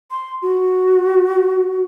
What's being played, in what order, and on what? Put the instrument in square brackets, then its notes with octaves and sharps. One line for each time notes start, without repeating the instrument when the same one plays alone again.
[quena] C6
F#4